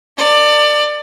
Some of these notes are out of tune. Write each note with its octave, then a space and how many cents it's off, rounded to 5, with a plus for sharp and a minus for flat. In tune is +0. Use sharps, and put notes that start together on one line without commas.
A#4 -45 D5 +20